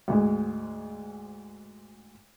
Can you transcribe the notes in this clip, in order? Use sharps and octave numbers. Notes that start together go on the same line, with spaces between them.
D2 G#2 G#3